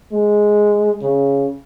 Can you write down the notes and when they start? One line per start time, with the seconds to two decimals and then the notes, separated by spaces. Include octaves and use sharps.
0.12 G#3
1.02 C#3